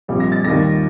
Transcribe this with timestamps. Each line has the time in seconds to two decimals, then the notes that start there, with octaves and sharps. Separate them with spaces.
0.08 A#1 A#2 G3 C4
0.20 A#6
0.32 A6
0.44 D#2 D#3 G3 A#6